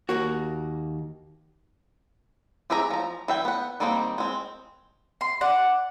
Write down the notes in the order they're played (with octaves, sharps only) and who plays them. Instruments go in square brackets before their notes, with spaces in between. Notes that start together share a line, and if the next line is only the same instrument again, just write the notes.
[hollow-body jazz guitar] D#2 A#3 F#4
[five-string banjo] C4 G4 G#4 E5 A#5
F3 A#5
E3 E5 G5
B3 F#5
D#3 G3 A#3 C4 D#4
G#3 C4
[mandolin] C6
D5 F#5